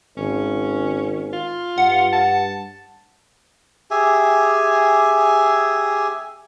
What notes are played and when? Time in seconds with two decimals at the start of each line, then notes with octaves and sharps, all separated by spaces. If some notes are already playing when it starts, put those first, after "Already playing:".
0.17 G#1 C#4
1.33 F4
1.78 G2 F#5
2.12 A5
3.91 G4 G#4 E5 G#5